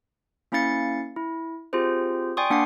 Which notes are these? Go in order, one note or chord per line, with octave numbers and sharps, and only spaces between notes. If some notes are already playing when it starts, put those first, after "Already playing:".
A#3 C#4 E4 F5 A6 C#7
E4
C4 F4 G4 G#4 C5
D5 G5 G#5 C6 C#6 D#6
A#3 D4 F#5 G5 D6 C7